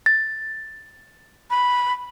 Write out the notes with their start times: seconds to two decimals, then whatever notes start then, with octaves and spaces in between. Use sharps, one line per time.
0.06 A6
1.50 B5